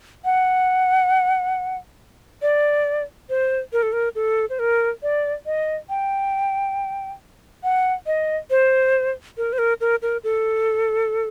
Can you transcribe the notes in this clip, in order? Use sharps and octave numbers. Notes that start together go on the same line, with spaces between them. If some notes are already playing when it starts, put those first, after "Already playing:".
F#5
D5
C5
A#4
A4
A#4
A4
C5
A#4
D5
D#5
G5
F#5
D#5
C5
A#4
C5
A#4
A#4
A#4
A4